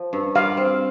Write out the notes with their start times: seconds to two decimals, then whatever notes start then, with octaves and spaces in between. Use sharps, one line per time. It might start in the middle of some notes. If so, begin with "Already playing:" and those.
Already playing: F3
0.13 G2
0.35 G3 F5
0.57 C4